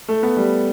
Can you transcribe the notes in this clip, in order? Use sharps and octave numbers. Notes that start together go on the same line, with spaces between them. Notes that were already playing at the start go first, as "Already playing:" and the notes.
A3
B3
G3